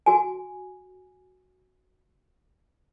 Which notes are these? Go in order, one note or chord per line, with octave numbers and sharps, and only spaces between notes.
F#4 G#5